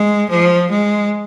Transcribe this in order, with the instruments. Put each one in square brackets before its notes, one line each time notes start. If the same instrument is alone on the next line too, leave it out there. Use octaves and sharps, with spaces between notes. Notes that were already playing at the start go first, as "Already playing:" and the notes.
Already playing: [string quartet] G#3
F3
G#3